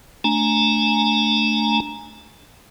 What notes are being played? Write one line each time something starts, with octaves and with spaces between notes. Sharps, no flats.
A3 D4 G#5 A#5